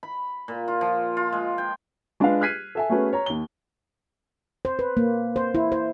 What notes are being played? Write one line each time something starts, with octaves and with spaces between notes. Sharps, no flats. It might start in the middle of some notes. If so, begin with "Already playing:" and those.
B5
A#2
F4
F3
F4
G#3
G5
G#3 D4 F4 G#4 B4 F5
F6 F#6 G#6 B6 C7 D#7
A4 E5 G#5
A3 B3 C#4 F#4 G#4 B4
C#5 A#5
D#2 G7
C5
B4
A#3
C5
E4
C5